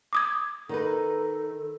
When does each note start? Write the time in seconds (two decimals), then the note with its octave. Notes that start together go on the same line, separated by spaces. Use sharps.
0.13 D6 D#6 G#6
0.69 D#3 D#4 A4 B4